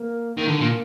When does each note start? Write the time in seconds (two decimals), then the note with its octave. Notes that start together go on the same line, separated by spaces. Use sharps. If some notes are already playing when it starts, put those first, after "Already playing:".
Already playing: A#3
0.37 D#3 A#3
0.48 D3
0.54 D#3
0.60 A#2 A#3